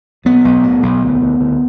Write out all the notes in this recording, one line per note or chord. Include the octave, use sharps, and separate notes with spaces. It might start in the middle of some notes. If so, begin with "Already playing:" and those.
B1 B3
B1
A2
B1
D2
D2
D2